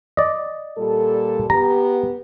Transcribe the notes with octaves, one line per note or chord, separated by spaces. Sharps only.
D5 D#5
A#2 G3 A4
B3 G4 A#5